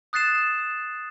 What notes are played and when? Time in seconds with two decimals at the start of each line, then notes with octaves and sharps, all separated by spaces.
0.13 D#6 F#6 A6 C7 E7